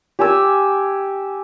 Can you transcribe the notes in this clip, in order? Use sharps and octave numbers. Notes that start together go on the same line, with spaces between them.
G4 G#5 A5 E6